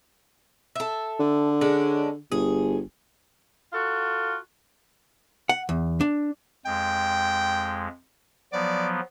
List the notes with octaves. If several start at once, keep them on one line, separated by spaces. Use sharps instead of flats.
A4 E5
D3
G#3 C#4 D4
G1 G#4
F4 F#4 A4
F#5
E2
D4
F2 G#3 G5
F3 F#3 B3 D5